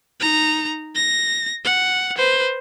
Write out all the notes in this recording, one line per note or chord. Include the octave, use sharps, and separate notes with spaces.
D#4 A#5
A#6
F#5
B4 C5